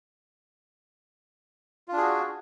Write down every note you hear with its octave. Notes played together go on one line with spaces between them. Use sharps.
D4 F4 F#4 G#4